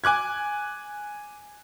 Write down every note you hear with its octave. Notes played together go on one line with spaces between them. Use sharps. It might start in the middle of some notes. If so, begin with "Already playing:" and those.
G#5 D6 F#6 G#6